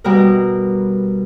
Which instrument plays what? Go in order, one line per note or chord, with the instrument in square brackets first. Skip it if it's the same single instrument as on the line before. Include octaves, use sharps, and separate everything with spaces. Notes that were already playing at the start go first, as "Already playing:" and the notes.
[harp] B2 G3 A#4